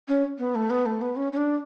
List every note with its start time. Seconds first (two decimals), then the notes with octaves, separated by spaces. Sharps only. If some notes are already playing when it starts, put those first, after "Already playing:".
0.08 C#4
0.39 B3
0.55 A3
0.70 B3
0.86 A3
1.01 B3
1.16 C#4
1.32 C#4
1.37 D4